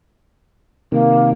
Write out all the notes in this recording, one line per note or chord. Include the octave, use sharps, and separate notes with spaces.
C3 D#3 A#3